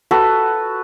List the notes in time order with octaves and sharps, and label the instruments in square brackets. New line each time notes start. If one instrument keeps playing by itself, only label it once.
[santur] F#4 A4 B4